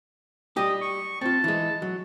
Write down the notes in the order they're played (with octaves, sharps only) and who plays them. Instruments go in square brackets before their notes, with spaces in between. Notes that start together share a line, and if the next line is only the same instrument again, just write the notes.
[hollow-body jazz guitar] G3 G4 [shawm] D#5
[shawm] C#6
[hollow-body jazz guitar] C4 F4 [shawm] A5
[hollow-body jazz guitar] E3 G#3
F#3